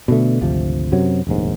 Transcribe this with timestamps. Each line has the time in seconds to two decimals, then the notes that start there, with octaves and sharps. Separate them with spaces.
0.08 B2 D3 A3
0.41 G#1 D2 C3 F3
0.92 F#2 C3 F#3
1.27 F1 A#1 D#2 G#2